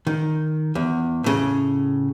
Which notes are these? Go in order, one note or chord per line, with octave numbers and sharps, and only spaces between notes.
D#3
E2
A2 C#3